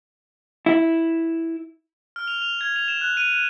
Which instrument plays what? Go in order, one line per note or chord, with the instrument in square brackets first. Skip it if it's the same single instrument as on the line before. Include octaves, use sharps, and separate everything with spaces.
[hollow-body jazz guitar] E4
[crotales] F6
F7
F7
G#6
F7
E7
F#6
D#7
F#6